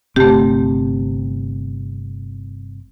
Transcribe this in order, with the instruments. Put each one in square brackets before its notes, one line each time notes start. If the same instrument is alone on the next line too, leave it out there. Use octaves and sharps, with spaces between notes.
[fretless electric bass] G1 C3 C4 [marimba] A3 G4